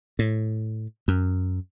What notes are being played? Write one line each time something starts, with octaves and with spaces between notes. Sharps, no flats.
A2
F#2